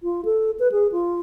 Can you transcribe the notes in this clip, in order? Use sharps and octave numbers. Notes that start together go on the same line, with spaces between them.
F4
A4
B4
G#4
F4